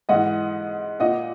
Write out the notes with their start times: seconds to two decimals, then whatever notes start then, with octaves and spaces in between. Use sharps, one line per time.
0.09 G#2 E3 D#5 F#5
1.00 A#2 D#5 F#5